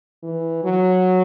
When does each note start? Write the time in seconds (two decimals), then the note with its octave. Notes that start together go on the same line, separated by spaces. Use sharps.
0.23 E3
0.64 F#3